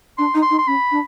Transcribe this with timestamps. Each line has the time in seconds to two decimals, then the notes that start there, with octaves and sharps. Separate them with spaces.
0.18 D4 C6
0.34 D#4
0.42 C6
0.50 D#4
0.59 C6
0.67 C#4 B5
0.91 D4